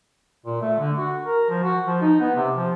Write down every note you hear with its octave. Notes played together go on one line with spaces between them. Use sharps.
A#2
A3
D3
F#4
A#4
F3
F#4
F3
D#4
B3
C3
F3